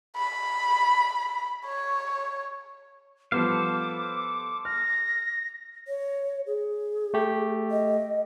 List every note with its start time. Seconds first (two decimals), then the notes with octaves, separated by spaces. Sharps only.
0.16 B5
1.66 C#5
3.32 F3 G3 B3 A4 C5 F5 D6
4.65 F6 A#6
5.88 C#5
6.46 G#4
7.14 A3 G4
7.71 D#5